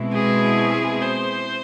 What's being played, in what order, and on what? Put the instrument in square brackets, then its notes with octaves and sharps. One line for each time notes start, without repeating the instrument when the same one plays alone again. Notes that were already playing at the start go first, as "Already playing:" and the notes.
Already playing: [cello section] B2 G#3 C4 E4
[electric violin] G#4
C5